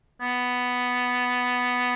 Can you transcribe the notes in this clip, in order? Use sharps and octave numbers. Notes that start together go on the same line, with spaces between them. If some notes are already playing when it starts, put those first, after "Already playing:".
B3